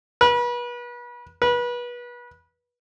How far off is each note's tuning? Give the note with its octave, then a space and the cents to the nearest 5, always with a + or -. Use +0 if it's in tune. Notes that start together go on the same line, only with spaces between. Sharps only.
B4 -35
B4 -30